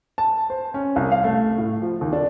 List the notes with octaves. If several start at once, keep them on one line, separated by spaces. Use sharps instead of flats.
A5
C5
C#4
C2
F5
A3
A2
F3
D#2
D4